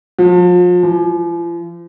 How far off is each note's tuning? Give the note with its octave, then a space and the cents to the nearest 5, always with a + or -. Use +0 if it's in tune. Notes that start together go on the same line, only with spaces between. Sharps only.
F3 +35
F3 -40